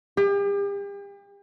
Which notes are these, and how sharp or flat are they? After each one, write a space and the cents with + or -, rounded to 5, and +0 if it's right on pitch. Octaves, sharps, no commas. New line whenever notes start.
G4 +40